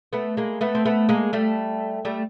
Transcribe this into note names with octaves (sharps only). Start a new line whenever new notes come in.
A3 B3
G#3 A#3
A3 B3
C4
A3 B3
G#3 A#3
G3 A3
G3 A3